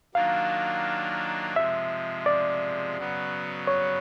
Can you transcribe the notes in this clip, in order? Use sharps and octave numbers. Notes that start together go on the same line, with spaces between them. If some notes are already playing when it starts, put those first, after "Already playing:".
D#3 F#3 A#3 D4 F4 F5
C3 F3 G#3 E5
D5
C#3 F#3 B3
C#5